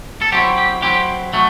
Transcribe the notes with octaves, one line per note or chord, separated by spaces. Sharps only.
A4
F#3 C4 E4 G4
G4
F#3 C4 E4 G4
F#3 A3